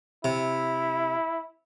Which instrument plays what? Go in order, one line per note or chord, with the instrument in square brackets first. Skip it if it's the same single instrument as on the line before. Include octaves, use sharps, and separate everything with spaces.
[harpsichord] C3 [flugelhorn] E4